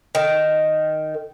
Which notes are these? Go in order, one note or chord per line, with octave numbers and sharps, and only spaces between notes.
D#3